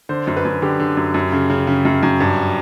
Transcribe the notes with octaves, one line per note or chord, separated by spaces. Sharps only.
D3 C5
F#2
B4
F#2
D3 G4
D3
F#2
F#2
C#3
C#3
C#3
F#2
F#2
G2